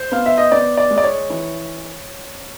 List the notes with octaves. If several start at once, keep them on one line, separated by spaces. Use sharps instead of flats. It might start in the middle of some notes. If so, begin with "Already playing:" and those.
Already playing: C5
B3 F5
E5
D#5
B3 D5
D5
G#3
D5
C#5
E3